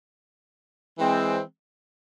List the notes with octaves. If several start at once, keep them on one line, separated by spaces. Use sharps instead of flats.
E3 G#3 C4